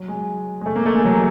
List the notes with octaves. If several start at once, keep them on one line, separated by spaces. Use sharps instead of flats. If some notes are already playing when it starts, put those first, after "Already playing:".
Already playing: F#3
G#3
G#3
A3
A#3
A3
G#3
F#3